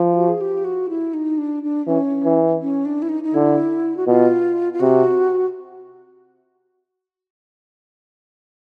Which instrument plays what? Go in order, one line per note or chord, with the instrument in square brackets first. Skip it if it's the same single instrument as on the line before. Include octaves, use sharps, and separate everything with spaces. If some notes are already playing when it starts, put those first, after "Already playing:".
Already playing: [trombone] F3
[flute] F4
F#4
G#4
G4
F#4
E4
D#4
D4
D4
[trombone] E3 [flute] C#4
[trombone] E3
[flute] C#4
D4
E4
D#4
D#4
[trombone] D3 [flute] E4
[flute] F#4
[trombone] B2 [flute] F4
[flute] F4
[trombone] C3 [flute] F#4